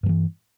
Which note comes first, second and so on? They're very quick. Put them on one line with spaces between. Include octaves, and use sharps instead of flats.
G2 F3 E3